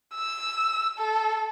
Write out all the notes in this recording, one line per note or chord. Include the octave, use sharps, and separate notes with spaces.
E6
A4